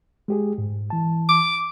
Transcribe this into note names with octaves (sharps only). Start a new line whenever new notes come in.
G#3 G4 G#4
G#2
E3 A5
D6